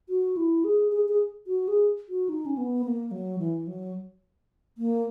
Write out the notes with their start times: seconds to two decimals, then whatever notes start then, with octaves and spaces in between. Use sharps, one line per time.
0.09 F#4
0.37 E4
0.64 G#4
0.92 G#4
1.08 G#4
1.47 F#4
1.68 G#4
2.09 F#4
2.29 D#4
2.46 C#4
2.57 B3
2.85 A#3
3.11 F#3
3.39 E3
3.67 F#3
4.78 A#3